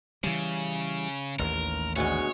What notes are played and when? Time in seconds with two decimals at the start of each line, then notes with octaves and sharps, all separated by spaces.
0.24 C#3 E3 G3
1.39 A1 D#2 A#4
1.96 D2 B2 G#3 C#5